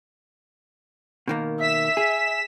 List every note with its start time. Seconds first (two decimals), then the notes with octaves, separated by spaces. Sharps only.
1.28 B2 D#3 A#3
1.60 E5 B6 E7
1.97 G#4